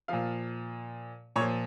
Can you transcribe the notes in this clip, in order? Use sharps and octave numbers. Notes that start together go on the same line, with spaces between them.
A#2 F3 F5
A#2 C#5
F3